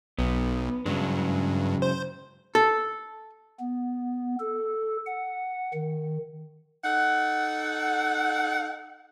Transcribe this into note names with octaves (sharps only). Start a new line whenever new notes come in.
B1 B3
G2 C#3 F#3 G#3
C5
A4
B3
A4
F#5
D#3
D#4 A4 F#5